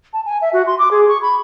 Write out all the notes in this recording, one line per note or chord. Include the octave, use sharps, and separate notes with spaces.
A5
G#5
E5
F#4
C6
D6
G#4
C#6
B5